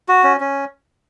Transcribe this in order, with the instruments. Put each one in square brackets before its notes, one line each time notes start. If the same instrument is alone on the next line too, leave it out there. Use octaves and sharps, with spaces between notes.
[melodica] F#4
C#4
C#4